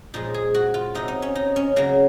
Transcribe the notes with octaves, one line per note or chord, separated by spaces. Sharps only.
A#2 F3 G#3 D#4
G#4
F#4
F4
C3 F#3 D#4
D#4
C#4
D#4
C#4
C#3 F#3 A#3